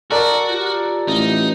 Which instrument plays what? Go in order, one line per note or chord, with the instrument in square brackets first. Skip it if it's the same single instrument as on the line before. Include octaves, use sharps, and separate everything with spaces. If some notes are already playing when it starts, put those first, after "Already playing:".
[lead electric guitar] F#4 [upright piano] A4 A#4 D5
[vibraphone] F4 G4
[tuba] A1 [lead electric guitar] D#4